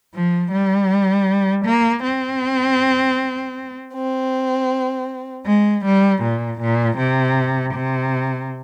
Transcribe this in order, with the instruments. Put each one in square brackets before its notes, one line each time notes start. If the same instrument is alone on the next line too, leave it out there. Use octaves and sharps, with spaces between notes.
[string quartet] F3
G3
A#3
C4
C4
G#3
G3
A#2
A#2
C3
C3